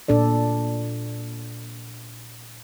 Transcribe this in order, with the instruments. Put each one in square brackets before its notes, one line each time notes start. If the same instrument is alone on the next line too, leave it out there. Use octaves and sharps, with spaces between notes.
[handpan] A#2 D4 A4 D5